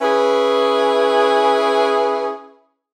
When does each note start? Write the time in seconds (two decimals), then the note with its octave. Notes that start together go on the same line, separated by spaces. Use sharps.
0.02 C#4 E4 G#4 B4